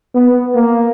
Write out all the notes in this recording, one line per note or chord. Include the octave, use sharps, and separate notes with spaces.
B3
A#3